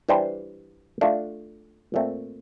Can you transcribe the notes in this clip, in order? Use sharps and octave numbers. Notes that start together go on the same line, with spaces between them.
E3 G3 D4 G4 C5
A3 D4 F4
A#2 A3 C4